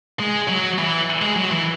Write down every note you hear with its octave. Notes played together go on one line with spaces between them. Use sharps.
G#3
F#3
E3
G#3
F#3
E3